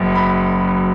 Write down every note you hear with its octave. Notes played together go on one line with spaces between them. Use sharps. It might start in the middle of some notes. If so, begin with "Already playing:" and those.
Already playing: F#1 F#2
B5